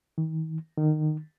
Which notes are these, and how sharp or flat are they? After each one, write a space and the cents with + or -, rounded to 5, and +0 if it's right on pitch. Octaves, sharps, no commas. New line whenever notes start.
D#3 +40
D#3 -20